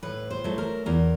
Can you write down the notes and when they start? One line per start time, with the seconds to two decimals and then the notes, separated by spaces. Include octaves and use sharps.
0.03 A2 B4
0.30 C5
0.44 F#3 A3
0.58 A#4
0.86 E2 A#4